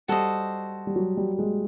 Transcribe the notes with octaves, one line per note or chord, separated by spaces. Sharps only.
G3 F#4 A4 C5 D#5
G3
F#3
G3
G#3